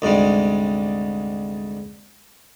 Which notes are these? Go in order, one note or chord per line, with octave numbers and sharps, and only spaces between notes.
D2 G#2 C3 G3